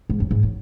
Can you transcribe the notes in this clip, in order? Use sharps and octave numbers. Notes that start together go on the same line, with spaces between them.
G#2
F#2
G#2
F#3